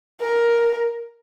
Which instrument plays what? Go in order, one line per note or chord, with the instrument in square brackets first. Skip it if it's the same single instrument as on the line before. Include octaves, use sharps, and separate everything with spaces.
[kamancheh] A#4